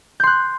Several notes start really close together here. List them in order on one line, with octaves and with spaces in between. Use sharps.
G6 C6 F#6